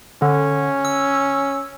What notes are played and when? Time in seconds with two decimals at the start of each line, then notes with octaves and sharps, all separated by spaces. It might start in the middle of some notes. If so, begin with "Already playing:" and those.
0.22 D3 C#4
0.85 E6